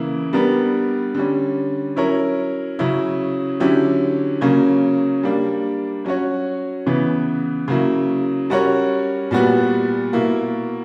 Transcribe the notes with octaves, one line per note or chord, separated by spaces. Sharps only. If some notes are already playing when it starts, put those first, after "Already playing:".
Already playing: C#3 E3 A#3 E4
G3 B3 D4 A#4
D3 G3 C#4
F#3 C#4 E4 A#4 C#5
C#3 F#3 C#4 E4
D3 F#3 C#4 E4 G4
C#3 F#3 A#3 C#4
G3 A#3 D4
F#3 C#4 F#4 C#5
C#3 E3 B3
C#3 F#3 A#3 E4
G3 C#4 F#4 A#4 C#5
A#2 G3 B3 F#4
B2 A#3 E4